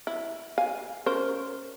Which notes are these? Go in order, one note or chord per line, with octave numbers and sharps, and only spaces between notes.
E4
F5 G#5
C#4 A#4 C5